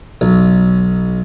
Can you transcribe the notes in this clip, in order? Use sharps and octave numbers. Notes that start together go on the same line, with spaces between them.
B1